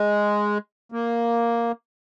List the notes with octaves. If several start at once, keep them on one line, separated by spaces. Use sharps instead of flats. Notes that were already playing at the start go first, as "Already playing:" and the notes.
Already playing: G#3
A#3